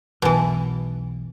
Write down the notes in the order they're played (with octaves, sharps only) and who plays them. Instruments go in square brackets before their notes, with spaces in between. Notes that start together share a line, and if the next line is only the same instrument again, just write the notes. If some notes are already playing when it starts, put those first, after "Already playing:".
[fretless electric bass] B1 E2 [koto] B2 E3